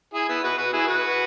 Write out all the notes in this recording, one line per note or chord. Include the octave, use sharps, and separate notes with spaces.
E4 G#4
B3 E4
F#4 B4
F#4 B4
E4 G#4
F#4 B4